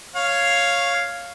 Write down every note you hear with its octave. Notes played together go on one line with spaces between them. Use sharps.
C#5 F5